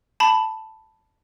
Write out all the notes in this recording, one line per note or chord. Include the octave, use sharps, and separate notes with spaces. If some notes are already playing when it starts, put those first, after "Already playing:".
A5 B5